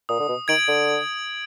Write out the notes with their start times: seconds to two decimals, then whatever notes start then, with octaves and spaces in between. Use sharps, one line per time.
0.09 A#2 D#6
0.19 D3
0.29 B2
0.48 D#3 G#6 D7 F#7
0.68 D3